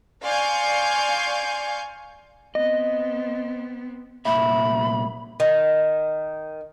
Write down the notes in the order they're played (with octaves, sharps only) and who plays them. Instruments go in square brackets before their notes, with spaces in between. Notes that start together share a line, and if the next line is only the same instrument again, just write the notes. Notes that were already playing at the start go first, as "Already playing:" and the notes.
[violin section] D5 F5 G#5 C6 C#6 G6
[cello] B3 C4 [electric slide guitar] D#5
[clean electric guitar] C2 A#2 E5 [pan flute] B5
[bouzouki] D#3